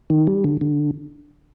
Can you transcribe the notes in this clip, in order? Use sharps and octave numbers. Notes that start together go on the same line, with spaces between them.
D#3
G3
D3
D3